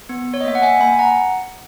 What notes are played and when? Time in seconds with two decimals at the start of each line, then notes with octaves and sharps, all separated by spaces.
0.09 B3
0.34 C#5
0.41 D#5
0.44 A#3 E5
0.55 F#5
0.62 E5 G#5
0.80 A#3 G#5 B5
0.99 F#5 A#5